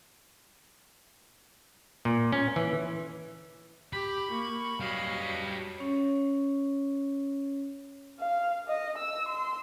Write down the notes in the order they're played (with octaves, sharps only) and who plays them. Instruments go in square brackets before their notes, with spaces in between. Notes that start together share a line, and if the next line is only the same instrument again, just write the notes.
[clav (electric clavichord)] A#2
C#4
E3
[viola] G4 [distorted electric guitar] B5
[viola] A#3 C#6
[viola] F#3 D#5 [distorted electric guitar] G3 F5
[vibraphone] C#4 C#5
[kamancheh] F5
D#5
E6
C6